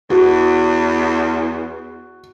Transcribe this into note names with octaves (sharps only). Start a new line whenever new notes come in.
E2 F#4